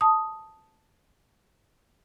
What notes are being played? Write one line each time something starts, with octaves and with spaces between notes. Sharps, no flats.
A5 D#6